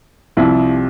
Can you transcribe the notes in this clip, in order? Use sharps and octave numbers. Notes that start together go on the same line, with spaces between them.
C2 C3 F3 E4